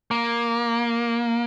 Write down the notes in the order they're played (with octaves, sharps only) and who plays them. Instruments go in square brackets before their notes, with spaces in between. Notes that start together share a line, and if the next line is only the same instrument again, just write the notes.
[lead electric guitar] A#3